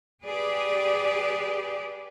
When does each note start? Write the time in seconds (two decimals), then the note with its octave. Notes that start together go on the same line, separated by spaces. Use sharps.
0.25 G4 G#4 B4 D5